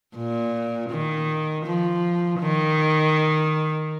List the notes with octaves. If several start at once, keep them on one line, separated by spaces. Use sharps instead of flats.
A#2
D#3
F3
D#3